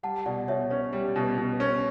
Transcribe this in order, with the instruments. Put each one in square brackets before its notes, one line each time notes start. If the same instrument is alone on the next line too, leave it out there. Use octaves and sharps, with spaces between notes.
[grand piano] G3 [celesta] F#5 A5
[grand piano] B2 [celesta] D5 F#5
[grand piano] B2 [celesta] C#5 E5
[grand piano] C#4 [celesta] C#5
[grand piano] G3 [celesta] C#5
[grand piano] B2
[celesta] B4
[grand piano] B2
C#4